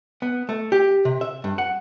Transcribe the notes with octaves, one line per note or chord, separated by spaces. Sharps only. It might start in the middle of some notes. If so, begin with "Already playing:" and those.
B3
A3
G4
C3
E5
G2
F#5